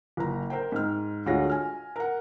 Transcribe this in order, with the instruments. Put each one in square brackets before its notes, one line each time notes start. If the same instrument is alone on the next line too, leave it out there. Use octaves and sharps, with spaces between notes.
[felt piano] F#1 A#5
A#4 C5 G5
G#2 F6
D2 G#3 F4 F#4 C#5 A#6
G#5 F6
A#4 F#5